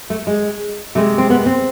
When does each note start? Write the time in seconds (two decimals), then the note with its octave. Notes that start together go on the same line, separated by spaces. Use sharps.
0.10 A3
0.27 G#3
0.95 C3 G#3 A3
1.18 C4
1.30 B3
1.46 C4